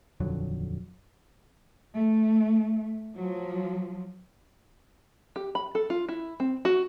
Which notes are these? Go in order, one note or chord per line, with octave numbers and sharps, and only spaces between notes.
D#1 F2 D3 F#3
A3
F3 F#3
G4
B5
A4
F4
E4
C4
F#4